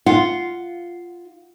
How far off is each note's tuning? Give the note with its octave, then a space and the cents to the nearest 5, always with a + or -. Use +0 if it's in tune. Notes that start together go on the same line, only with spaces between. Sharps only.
F4 -5 F#5 +0